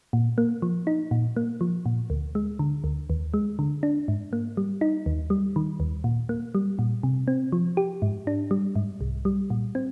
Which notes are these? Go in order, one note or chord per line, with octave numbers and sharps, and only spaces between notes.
A#2
A#3
F3
D#4
A#2
A#3
F3
A#2
D2
G#3
D3
D2
D#2
G#3
D3
D4
G#2
A#3
G3
D#4
D#2
G3
D#3
D#2
A#2
A#3
G3
A#2
C3
C4
F3
G4
G#2
D4
G3
G#2
C2
G3
A#2
C4